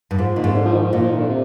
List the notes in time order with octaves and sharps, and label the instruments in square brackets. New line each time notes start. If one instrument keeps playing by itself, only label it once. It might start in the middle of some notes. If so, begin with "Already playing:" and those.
[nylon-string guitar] G2
[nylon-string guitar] G#2 [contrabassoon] F3
[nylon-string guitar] A#2 [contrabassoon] D#3
[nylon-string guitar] G#2 [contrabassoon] C3
[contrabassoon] D3
F3
D#3
F3
[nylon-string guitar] A#2 [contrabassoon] D#3
[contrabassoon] F3
D#3
D3
C3